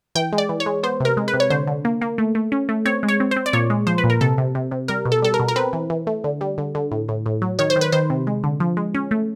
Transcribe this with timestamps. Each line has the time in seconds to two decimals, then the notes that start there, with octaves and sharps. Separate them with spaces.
0.15 E3 G5
0.33 G#3
0.38 D5
0.49 E3
0.60 C#5
0.66 G#3
0.83 B3 C5
1.00 C3 A#4
1.17 G#3
1.28 B4
1.34 C3
1.40 C#5
1.50 D3 C5
1.67 D3
1.85 A#3
2.01 A#3
2.18 A3
2.35 A3
2.52 C#4
2.69 A3
2.85 C4 C#5
3.03 G#3
3.08 C#5
3.20 C4
3.31 C5
3.36 C4
3.46 D5
3.53 A#2 C#5
3.70 G#3
3.87 F3 C5
3.98 B4
4.04 A#2
4.10 A#4
4.21 C3 A4
4.38 C3
4.55 C3
4.71 C3
4.88 G3 A#4
5.05 B2
5.12 A4
5.22 G3 A4
5.34 A#4
5.40 B2
5.48 A#4
5.56 C4 B4
5.73 E3
5.90 E3
6.07 A3
6.24 D3
6.41 G3
6.58 D3
6.75 D3
6.91 A2
7.08 A2
7.26 A2
7.42 F#3
7.59 D#3 C#5
7.70 C5
7.76 D#3
7.81 B4
7.92 D#3 C5
8.10 C3
8.27 G#3
8.44 D3
8.60 F3
8.77 G#3
8.94 C#4
9.11 A3